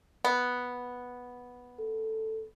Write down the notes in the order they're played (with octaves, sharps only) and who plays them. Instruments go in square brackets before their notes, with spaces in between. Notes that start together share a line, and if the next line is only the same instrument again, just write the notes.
[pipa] B3
[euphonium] A4